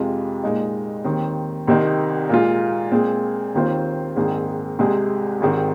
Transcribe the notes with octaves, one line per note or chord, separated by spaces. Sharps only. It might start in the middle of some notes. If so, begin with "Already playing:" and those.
Already playing: F2 C3 G#3 C4 F4
A#2 G#3 D#4
D#2 D#3 C4
C2 C3 D#3 C4 D#4
A#2 G#3 F4
A#2 G#3 C4 G#4
D#2 D#3 C4 F4 C5
A#1 G#2 D#3 C4 G#4
C2 C3 G#3 C4 G#4
G#1 G#2 D#3 C4